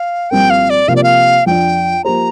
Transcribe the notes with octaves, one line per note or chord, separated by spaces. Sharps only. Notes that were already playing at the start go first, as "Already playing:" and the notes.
Already playing: F5
C2 A#2 F3 C4 A#4 G5
F5
D5
C3 F3 A#3 F5
D5
F5
F2 F3 D4 G5
F3 A#3 G4 C5 A#5